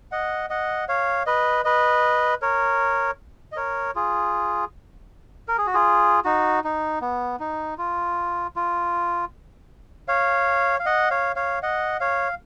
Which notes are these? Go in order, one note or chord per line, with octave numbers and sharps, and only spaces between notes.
D#5 F#5
D#5 F#5
C#5 F5
B4 D#5
B4 D#5
A#4 C#5
D#5
A#4 C#5
F4 G#4
A#4
G#4
F#4
F4 G#4
D#4 F#4
D#4
B3
D#4
F4
F4
C#5 F5
F5
D#5 F#5
C#5 F5
C#5 F5
D#5 F#5
C#5 F5